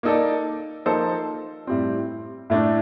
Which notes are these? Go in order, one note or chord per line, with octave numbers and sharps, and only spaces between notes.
A#3 D#4 A4 D5
F3 A#3 D#4 A4 C5
A2 G3 C4
A2 A3 D4